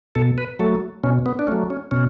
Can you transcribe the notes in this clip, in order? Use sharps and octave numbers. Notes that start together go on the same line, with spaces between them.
B2 A4
B4
F#3 A3 A4
B2 C#4
B3
D4
F#3 A3 C#4
C#4
B2 C#4